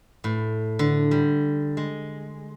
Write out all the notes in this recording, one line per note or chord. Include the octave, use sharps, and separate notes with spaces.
A2
D3
G3
G#3